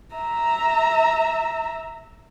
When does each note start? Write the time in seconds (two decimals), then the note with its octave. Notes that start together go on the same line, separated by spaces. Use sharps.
0.15 E5 A#5